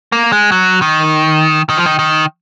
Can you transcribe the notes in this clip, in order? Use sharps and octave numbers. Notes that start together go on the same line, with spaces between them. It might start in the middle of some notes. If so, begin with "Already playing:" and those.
A#3
G#3
F#3
D#3
D#3
F3
D#3
D#3